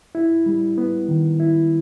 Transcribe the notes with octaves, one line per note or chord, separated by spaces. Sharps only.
E4
G3
B3
D#3
E4